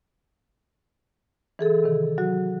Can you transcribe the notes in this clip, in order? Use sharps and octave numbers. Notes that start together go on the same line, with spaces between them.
E3 G#4 A4
C3 D#3
F#3 F#4